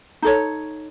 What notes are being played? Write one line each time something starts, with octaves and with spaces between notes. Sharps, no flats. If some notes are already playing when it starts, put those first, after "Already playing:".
D#4 A4 C#5